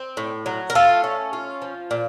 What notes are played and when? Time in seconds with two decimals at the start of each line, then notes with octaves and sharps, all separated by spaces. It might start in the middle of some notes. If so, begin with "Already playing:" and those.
Already playing: C4
0.17 A2
0.46 F#3
0.70 A#4
0.75 A3 F4 A4
1.04 C#4
1.33 F4
1.62 F3
1.91 A#2